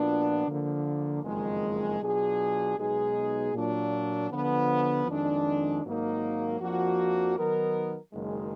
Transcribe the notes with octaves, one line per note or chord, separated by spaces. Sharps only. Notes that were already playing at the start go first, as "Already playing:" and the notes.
Already playing: A#2 F3 B3 D4 F#4
D3 F3 A#3
F#1 F2 D#3 G#3
B2 F#3 D4 F4 G#4
B1 B2 G#3 D#4 G#4
A#2 F#3 D4
D3 F3 B3
F2 D#3 G#3 D4
G#1 G#2 F#3 A#3 D#4
F2 F3 A#3 D4 F#4
D#3 F#3 B3 D#4 A#4
F#1 F#2 D#3 G#3